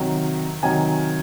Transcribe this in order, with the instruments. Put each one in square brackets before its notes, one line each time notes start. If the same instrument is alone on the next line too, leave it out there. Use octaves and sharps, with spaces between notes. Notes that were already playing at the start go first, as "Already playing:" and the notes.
Already playing: [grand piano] C3 D#3 F#3
C3 D#3 F#3 G#5